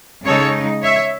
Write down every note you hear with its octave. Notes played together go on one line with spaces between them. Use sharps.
C#3 G#3 D#4 A4 C#5
C#5 E5